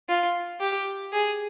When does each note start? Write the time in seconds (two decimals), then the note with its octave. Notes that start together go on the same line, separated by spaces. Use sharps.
0.09 F4
0.60 G4
1.13 G#4